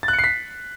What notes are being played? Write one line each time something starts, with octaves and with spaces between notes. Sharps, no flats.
A6
F#6
C#7
C7
B6